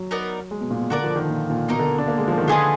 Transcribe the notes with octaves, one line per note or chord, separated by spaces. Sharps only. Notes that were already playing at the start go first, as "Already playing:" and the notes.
Already playing: F#3
B3 D#4 A#4 D5
G#3
B2
A#2
B2
D3 F#4 A#4 D5
F3
D#3
A#2
A#2
B2 A#3 D#4 A#4
D3
D4
A#3
G#3
F3
D#3
D3 F4 G#4 B4 D#5